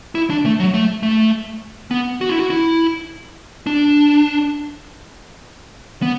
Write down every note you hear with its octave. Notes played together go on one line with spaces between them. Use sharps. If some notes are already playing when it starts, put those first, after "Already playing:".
E4
D4
A3
F#3
A3
A3
B3
F#4
E4
F#4
E4
D4
B3